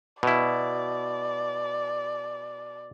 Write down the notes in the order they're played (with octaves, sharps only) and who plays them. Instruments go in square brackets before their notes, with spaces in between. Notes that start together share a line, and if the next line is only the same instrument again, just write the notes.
[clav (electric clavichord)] B2 E4 [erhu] D5